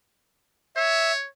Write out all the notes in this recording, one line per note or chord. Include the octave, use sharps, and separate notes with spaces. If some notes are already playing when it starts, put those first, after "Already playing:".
C#5 E5